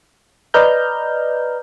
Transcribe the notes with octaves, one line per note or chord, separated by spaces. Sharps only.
B4 D5 D#5 A#5 F6 G6